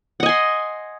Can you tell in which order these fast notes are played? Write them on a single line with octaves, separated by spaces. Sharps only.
F#5 D#5 G#5 C6